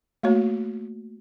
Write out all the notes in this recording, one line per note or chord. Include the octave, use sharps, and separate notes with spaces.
A3 A#3 F#4 C#5